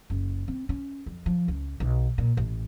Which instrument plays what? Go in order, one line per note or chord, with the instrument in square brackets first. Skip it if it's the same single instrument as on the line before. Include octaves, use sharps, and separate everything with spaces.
[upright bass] F#1
C4
C#4
F2
F3
C#2
B1
A#2
A1